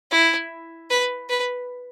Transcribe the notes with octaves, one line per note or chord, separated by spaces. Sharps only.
E4
B4
B4